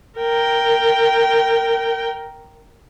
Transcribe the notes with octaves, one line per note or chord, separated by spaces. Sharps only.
A#4 G5